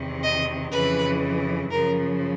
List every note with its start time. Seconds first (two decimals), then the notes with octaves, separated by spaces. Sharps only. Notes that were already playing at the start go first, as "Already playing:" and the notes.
Already playing: E2 C3 D#3
0.22 D#5
0.72 F2 C#3 E3 B4
1.70 F#2 C#3 F3 A#4